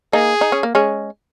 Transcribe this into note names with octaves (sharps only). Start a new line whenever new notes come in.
A#3 D#4 G#4
D#4
C#4
A#3
G#3 C#4